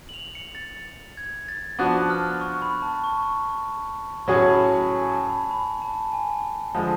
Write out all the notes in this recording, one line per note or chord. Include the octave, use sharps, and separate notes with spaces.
F#7
F7
C#7
A6
G#6
A6
F3 B3 D4 F#4 F#6
F6
C#6
B5
A5
C#6
A2 F#3 C#4 G#4 C#6
B5
A5
B5
G#5
A5
B5
B5
A5
G#5
D3 F3 G#3 A5